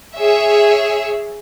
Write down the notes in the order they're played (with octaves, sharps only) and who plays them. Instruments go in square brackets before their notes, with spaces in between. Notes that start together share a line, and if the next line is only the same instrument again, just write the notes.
[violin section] G#4 C#5 E5